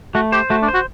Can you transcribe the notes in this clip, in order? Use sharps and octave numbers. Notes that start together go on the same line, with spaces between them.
A3 F#4
G4 C5
A3 F#4
D4
C5
F#4